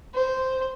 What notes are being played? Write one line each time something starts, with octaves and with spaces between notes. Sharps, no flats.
C5